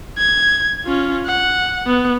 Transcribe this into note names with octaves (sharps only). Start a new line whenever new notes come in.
G#6
C#4 F4
F#5
B3